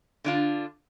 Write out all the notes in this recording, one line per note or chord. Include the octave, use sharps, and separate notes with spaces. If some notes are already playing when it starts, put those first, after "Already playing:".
D3 D4 F4